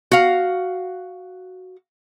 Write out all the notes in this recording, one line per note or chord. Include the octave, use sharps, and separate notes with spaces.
F#4 F5